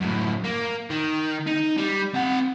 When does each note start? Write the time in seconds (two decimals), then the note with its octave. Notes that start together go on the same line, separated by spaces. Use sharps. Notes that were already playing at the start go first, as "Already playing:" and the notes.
0.01 F#2 A2
0.44 A#3
0.90 D#3
1.47 D#4
1.78 G3
2.14 C4 F#5